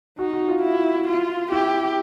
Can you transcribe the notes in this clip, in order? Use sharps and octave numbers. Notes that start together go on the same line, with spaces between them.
D#4 F#4
F#4
F4
E4
F4
E4 G4